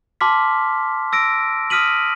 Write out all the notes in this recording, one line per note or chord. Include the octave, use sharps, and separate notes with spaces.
A5 C6 D6 F6 B6
E6 A#6 D7
D#6 F6 B6 D#7 F#7